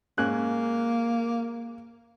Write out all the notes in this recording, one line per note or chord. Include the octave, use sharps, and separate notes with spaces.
G#2 A#3 C#4 F#6